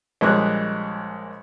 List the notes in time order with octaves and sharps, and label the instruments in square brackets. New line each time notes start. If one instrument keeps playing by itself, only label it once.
[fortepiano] A#1 G3 G#3 C#5 F#6